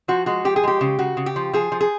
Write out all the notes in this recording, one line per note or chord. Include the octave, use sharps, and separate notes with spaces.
F3 F#4
G#3 F#4
F3 G4
G#4
G#3 G4
C#3
C#3 F#4
C#3
G4
F3
F3 G#4
F3
G#4